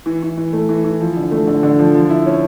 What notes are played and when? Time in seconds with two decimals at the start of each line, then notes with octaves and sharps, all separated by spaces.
0.06 E3
0.23 E3
0.37 E3
0.53 A3
0.69 E3
0.85 E3
1.00 F3
1.16 D3
1.31 A3
1.47 D3
1.63 D3
1.79 F3
1.95 F3
2.10 E4
2.26 C#4